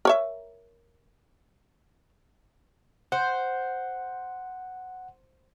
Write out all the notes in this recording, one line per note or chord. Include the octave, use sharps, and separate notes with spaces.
A#4 C#5 E5
C5 F#5